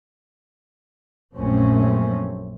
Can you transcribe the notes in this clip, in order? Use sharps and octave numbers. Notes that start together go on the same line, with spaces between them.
A#1 F#2 A3 C4 C#4